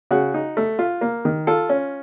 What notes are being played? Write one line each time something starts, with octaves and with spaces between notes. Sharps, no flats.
C#3 F#4
D#4
A3
F4
A#3
D#3
F4 A4
C#4